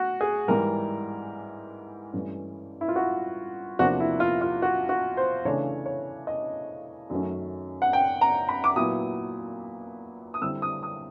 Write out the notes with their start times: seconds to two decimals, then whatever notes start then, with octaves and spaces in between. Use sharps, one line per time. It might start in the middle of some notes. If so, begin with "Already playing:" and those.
Already playing: A2 F#4
0.21 G#4
0.48 G#2 E3 G3 A#4
2.13 G2 E3 A3 C#4
2.81 E4
2.88 F4
2.96 F#4
3.79 E2 C3 F3 A#3 D4 F#4
4.00 E4
4.20 F4
4.41 F4
4.62 F#4
4.89 F#4
5.17 C5
5.45 C#3 E3 A3 D4 C#5
5.86 C#5
6.27 D#5
7.10 F#2 D#3 F#3 A3 C#4
7.82 F#5
7.93 G5
8.21 A#5
8.49 B5
8.64 D6
8.76 A#2 F#3 B3 E4 D#6
10.34 D#6
10.42 D3 G3 C4 E4 E6
10.62 D#6
10.83 D#6